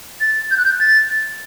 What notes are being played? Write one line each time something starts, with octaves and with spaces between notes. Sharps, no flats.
A6
G6
F#6
G6
A6